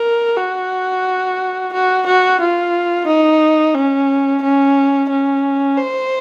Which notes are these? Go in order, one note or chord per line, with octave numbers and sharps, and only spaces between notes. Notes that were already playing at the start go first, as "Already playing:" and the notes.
Already playing: A#4
F#4
F#4
F#4
F4
D#4
C#4
C#4
C#4
C5